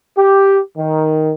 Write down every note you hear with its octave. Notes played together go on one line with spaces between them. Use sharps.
G4
D#3